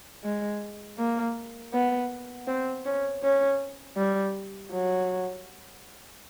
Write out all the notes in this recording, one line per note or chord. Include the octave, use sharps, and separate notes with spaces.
G#3
A#3
B3
C4
C#4
C#4
G3
F#3